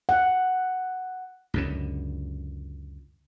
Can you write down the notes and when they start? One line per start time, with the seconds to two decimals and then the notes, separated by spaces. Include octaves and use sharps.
0.09 F#5
1.54 C#2 F#2 D3